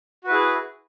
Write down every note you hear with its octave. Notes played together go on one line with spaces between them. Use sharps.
E4 F#4 G#4 B4